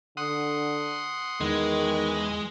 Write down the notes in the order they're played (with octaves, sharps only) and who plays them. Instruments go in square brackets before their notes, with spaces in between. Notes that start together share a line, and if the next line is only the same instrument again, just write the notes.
[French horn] D3 [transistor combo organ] F#5 C6 D#6
[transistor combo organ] E2 D#5 [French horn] D#3 [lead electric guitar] G#3